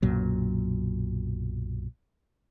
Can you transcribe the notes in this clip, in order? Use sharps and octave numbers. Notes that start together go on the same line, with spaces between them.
B1 F#2 A#2 F#3